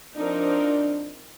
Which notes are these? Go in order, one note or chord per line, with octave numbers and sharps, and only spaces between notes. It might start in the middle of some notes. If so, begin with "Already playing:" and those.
F3 C4 D4 D#4 A#4